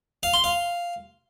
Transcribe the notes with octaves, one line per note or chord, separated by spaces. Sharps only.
F5
C6
F5